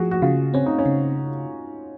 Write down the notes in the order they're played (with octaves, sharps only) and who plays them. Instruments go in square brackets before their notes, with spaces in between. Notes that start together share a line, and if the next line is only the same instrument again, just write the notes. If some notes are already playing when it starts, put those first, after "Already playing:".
Already playing: [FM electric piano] F3 [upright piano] F#4 G#4
[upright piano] F#4
[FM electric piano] C#3 [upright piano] F4
[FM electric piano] C4 [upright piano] C#4
[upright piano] D#4
C#4
[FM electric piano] C#3